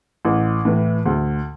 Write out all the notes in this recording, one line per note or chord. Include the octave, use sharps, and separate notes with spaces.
A1
A2 E3
D2